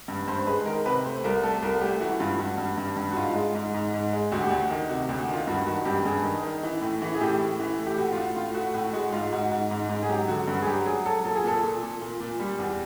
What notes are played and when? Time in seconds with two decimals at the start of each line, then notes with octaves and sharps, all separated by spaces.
0.08 G2
0.28 G2 C5
0.47 G#3 B4
0.65 D#3 A#4
0.85 C3 B4
1.04 A3 C5
1.24 C2 A#4
1.43 A3 A4
1.62 C2 A#4
1.81 A3 G4
2.00 E3 F#4
2.19 G2 F4
2.39 G2 F#4
2.58 G2
2.78 G2
2.96 G2
3.12 F#4
3.16 G#2 F4
3.35 G#3
3.55 G#2
3.74 G#2
3.94 G#2
4.13 G#3
4.32 D2 F#4
4.40 G4
4.49 D2 F#4
4.70 D#3
4.89 C3 F#4
5.09 D2
5.18 F#4
5.28 D#3
5.33 F4
5.47 G2 F#4
5.66 D#3 F#4
5.85 G2 G4
6.05 G2 G#4
6.24 D#3
6.43 D#3
6.63 E3
6.81 A2
7.02 E3
7.15 G#4
7.20 A2 G4
7.39 A2
7.60 E3
7.79 A3
7.87 G4
7.97 A2 F#4
8.12 F4
8.17 A2 F#4
8.36 A2 F4
8.55 A3 F#4
8.74 A2 F#4
8.93 G#3 F#4
9.12 G#2 F4
9.32 G#2 F#4
9.52 G#2
9.71 G#2
9.89 G#2
10.03 G#4
10.09 F#3 G4
10.28 D3 F#4
10.48 G2 F#4
10.62 G#4
10.66 F#3 G4
10.86 F#3 G#4
11.06 F#3 A4
11.24 A#2 A4
11.35 G#4
11.44 A#2 A4
11.63 A#2
11.83 A#2
12.02 A#2
12.20 A#2
12.40 G3
12.59 E2